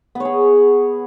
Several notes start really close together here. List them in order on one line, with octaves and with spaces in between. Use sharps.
B3 C#5 G#4